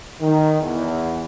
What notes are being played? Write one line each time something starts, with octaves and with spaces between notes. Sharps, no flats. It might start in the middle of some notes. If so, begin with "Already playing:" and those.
D#3
E2